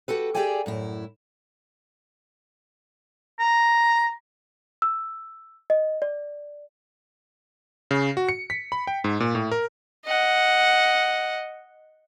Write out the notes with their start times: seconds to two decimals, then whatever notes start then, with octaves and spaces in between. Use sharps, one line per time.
0.08 F#4 G4 A4 B4
0.35 G4 G#4 D5 E5 G5 G#5
0.66 F#2 A2 E4
3.40 A#5
4.82 E6
5.70 D#5
6.02 D5
7.91 C#3
8.17 F#4
8.29 C#7
8.50 B6
8.72 B5
8.87 G5
9.04 G#2
9.20 A#2
9.35 A2
9.51 A#4
10.06 D#5 F#5